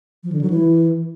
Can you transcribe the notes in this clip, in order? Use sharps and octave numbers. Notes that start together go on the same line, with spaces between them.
F3
D3
F#3
E3